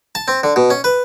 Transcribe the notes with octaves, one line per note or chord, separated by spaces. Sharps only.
A5
C4
D3
B2
C#4
B4